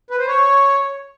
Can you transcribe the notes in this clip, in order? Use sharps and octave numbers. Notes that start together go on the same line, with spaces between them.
B4
C5
C#5